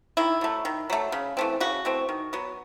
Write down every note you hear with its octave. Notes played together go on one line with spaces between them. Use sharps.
D#3 E4
F#3 A3
D#3
F#3 A3
C#3
E3 A3 C4
C#3 F#4
E3 A3 C4
D#3
F#3 B3